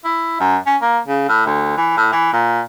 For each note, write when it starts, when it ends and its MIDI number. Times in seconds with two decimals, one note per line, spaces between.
0.05 0.40 64
0.40 0.57 42
0.66 0.76 61
0.82 0.98 58
1.08 1.28 49
1.29 1.45 45
1.46 1.73 38
1.77 1.96 52
1.97 2.07 45
2.12 2.31 52
2.33 2.61 46